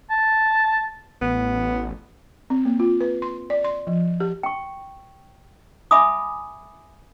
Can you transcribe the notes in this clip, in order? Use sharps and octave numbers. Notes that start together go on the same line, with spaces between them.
A5
A1 B3
C4
A#3
F4
B4
C6
D5
C6
F3
G4
G5 C#6
E5 G#5 B5 D6 D#6